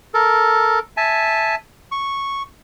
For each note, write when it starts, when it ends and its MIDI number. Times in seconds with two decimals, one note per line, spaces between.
0.14 0.79 69
0.14 0.79 70
0.97 1.55 76
0.97 1.55 80
0.97 1.55 81
1.92 2.43 85